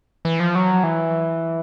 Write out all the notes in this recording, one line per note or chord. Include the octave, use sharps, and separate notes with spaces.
E3
F3
F#3
E3